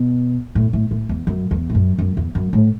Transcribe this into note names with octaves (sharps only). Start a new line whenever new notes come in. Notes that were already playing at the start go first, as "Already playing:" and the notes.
Already playing: B2
A2
A2
A2
E2
F#2
E2
A2
F#2
F#2
E2
F#2
A2